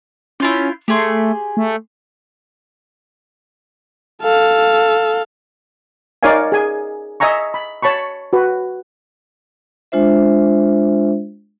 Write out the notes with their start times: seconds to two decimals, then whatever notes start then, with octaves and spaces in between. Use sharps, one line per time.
0.40 C#4 E4 F4 G6
0.88 A3 G4 G#4 C6
1.57 A3
4.22 A4 F5
6.23 D#4 A#4 C#5 D5 F5 G#5
6.52 G#4 G#5
7.20 D#5 E5 G#5 A#5 C#6
7.54 B5
7.82 C#5 A5 B5 C#6
8.33 F#4 B4
9.92 G#3 D4 F4 C5 E5